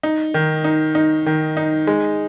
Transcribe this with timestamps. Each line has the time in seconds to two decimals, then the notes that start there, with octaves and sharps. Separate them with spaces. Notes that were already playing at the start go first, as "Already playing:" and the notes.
0.03 D#4
0.34 D#3
0.64 D#4
0.95 D#4
1.26 D#3
1.57 D#4
1.87 G#3